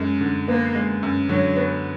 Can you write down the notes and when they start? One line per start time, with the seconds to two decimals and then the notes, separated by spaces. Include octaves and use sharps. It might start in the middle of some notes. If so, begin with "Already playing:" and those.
Already playing: F#2 G#3
0.21 D3
0.48 A#3 B3
0.75 G#3
1.03 F#2
1.29 D3 F#3
1.56 B3